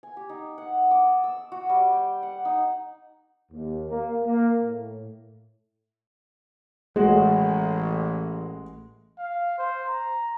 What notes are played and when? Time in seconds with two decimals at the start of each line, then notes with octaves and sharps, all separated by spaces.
0.03 G#5
0.17 G4
0.29 D#4
0.58 F#5
0.91 D6
1.06 A5
1.24 E6
1.52 F#4
1.69 G3
1.93 G5
2.23 F#5
2.45 D#4
3.52 D#2
3.90 A#3
4.24 A#3
4.62 A2
6.96 A1 G#3 A3 F#4
9.18 F5
9.58 C5
9.89 A#5